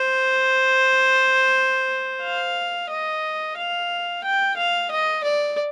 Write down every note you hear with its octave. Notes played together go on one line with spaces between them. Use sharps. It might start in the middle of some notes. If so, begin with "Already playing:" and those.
Already playing: C5
F5
D#5
F5
G5
F5
D#5
D5